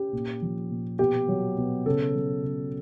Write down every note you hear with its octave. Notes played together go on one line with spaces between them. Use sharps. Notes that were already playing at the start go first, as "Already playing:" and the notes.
Already playing: C#4 G4
A#2
F3
A#2
B2 G4
F#3
B2
C#3 A4
F#3
C#3